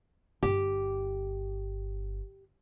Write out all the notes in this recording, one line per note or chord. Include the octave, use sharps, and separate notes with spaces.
G1 G4